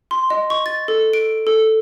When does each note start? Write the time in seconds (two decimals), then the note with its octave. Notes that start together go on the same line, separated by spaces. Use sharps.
0.11 C6
0.30 D#5
0.50 C#6
0.66 A6
0.88 A4
1.13 D7
1.47 A4